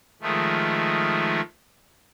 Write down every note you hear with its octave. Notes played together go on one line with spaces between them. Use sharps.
D#3 F3 G#3 A3